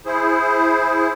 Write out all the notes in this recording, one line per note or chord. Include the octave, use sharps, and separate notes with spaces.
E4 G#4 C5